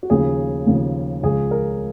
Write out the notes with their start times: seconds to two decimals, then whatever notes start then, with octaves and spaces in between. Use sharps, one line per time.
0.03 F#4
0.10 D#2 C#3 F3 G#4
0.67 D#2 C#3 F3
1.22 C#2 C#3 F3 G#4
1.51 A#4